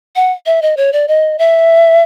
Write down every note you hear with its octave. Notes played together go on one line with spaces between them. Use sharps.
F#5
E5
D#5
C#5
D5
D#5
E5